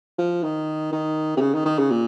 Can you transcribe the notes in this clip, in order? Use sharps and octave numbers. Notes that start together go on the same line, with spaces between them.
F3
D#3
D#3
C3
C#3
D#3
D#3
C#3
A#2